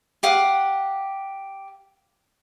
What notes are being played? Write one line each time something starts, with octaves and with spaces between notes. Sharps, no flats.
G4 F5 F#5 D#6